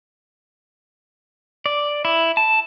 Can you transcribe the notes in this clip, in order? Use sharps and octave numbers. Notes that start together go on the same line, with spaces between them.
D5
E4
A5